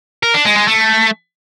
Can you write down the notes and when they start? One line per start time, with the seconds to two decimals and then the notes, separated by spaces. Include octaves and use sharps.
0.23 A#4
0.34 D4
0.45 G#3
0.57 G#3
0.68 A3